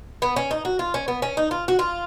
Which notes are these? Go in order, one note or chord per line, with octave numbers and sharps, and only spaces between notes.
B3
C#4
D#4
F#4
F4
C#4
B3
C#4
D#4
F4
F#4
F4